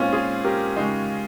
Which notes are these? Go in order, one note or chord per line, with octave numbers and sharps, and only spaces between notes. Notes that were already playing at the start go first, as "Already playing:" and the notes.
Already playing: A#2 G#3 C4 C#4 D#4 F4
F4 G#4
G4 A#4
C#3 G#3 D#4